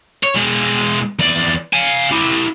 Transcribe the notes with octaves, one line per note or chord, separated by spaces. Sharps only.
C#5
B2 G#3
E2 D5
F5 G#5
E4 G4